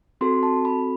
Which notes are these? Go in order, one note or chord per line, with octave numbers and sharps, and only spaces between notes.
C4 F#4 A4 C6
A5
B5